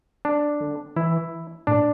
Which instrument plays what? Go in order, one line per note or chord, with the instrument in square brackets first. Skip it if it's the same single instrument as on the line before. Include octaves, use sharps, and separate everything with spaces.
[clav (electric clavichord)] D4
[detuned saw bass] D3
[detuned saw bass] E3 [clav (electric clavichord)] E4
[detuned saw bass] A2 [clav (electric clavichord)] D4